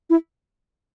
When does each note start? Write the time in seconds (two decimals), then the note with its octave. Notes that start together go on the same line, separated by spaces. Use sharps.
0.10 E4